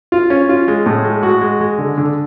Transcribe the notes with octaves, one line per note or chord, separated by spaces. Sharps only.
F4
C#4
F4
G#3
A2
G#3
F#4
G#3
G#3
D3
D3